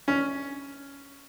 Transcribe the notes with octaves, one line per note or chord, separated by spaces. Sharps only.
C#4